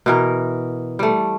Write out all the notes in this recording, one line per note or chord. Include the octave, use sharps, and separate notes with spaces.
B2 E3 A#4
G3 A3